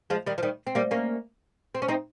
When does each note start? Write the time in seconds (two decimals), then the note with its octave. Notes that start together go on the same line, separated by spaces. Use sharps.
0.10 F3 G#3
0.26 D#3 G3
0.38 F3
0.43 D#3 G3
0.67 C4
0.75 G3 A#3
0.91 A#3 C#4
1.75 C4
1.82 C#4
1.88 C4 D#4